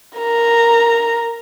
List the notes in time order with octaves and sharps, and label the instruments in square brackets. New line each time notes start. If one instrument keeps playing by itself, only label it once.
[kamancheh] A#4 A#5